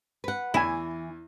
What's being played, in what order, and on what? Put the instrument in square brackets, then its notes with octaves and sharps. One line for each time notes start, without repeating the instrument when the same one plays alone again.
[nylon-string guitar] B4 F#5
[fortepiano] E2 G#5 [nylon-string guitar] E3 [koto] E4